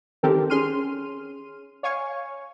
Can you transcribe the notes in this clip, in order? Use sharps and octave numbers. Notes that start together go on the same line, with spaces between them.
D#3 C4 G4 A4 A#4
C#4 G#4 C6 F6 D#7
C#5 F5 G#5 C#6